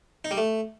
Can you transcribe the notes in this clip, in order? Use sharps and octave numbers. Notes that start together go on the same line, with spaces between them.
D#4
G3
A3